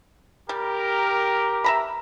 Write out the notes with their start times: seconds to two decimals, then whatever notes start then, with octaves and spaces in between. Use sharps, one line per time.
0.49 G3 G4 A#4
1.64 E5 A#5 B5